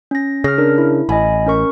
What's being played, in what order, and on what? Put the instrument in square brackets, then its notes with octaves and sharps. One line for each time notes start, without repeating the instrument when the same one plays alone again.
[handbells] C#4 A#6
[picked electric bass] C#3 [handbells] F6 A#6
[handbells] D4 A#4
E4
[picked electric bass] A1 [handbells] D#5 G#5 B5
[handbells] C#4 A#4 C#6